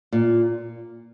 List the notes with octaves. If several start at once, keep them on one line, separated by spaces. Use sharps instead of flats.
A#2